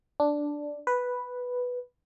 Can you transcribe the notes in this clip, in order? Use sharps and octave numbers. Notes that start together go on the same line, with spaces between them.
D4
B4